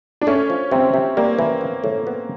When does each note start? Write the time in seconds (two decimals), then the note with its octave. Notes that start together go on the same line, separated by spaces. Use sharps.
0.21 D4
0.27 A3 C#4
0.50 F3
0.71 C3 C4
0.94 C3
1.17 G3 A#3
1.39 E3
1.61 B3
1.84 A2
2.07 B3